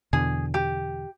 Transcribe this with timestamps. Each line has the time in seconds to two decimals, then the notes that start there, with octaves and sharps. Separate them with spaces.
0.13 E2 B2 D3 G#4
0.54 G4